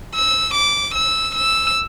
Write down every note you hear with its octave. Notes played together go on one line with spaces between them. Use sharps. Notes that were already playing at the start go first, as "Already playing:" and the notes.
E6
D6
E6
E6